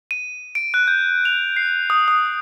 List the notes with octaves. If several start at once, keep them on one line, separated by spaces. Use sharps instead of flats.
D#7
D7
F#6
G6
F7
C7
D#6
D#6